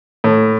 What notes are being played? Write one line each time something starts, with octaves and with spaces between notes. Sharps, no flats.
A2